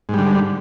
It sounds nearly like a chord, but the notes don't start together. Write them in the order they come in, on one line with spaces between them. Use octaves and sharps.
G#2 G3 D3